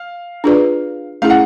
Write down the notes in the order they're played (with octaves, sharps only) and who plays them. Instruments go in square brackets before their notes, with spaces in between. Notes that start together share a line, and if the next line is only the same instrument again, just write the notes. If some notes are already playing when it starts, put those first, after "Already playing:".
Already playing: [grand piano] F5
[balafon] D4 F4 G#4 B4 D5
[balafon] A3 C#4 E4 G#4 [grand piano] F5
[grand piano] F#5